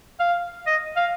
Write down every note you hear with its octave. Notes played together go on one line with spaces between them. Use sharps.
F5
D#5
F5